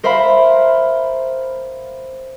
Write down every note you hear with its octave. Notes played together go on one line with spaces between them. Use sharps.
A#4 C5 E5 F5 B5